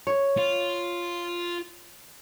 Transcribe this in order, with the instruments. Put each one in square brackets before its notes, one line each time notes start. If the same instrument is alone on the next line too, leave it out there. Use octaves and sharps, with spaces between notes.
[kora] C#5
[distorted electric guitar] F4